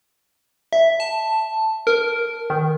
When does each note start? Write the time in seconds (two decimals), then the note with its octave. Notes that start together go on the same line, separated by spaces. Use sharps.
0.73 E5
1.00 A5
1.87 A#4
2.50 D#3